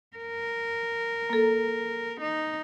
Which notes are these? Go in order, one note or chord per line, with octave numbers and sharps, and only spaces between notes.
A#4
A#3 A4
D#4